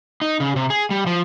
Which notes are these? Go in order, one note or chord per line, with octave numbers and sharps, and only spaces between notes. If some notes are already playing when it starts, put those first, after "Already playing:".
D#4
C#3
C3
G#4
G3
F3